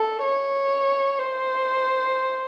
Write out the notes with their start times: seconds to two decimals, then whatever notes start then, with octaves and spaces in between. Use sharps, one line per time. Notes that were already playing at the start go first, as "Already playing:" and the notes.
Already playing: A4
0.24 C#5
1.19 C5